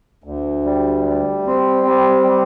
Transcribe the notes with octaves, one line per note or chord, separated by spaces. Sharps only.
D2
G3
G3
C4
G3
G3